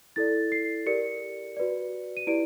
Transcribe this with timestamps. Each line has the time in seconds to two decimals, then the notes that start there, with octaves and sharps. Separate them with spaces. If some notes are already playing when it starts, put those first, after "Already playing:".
0.16 E4 A4 D5 A6
0.52 C7
0.86 G4 A#4 D5 C#7
1.57 F#4 B4 D5
2.17 D#7
2.27 E4 G4 B4 D5 D7